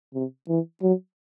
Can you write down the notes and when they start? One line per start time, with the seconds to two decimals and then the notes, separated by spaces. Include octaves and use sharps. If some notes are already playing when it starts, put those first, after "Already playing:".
0.14 C3
0.48 E3
0.82 F#3